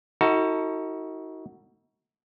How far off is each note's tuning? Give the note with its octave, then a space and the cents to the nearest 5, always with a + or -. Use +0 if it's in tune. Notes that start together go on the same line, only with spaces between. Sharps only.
D#4 +40 F#4 +0 A4 +40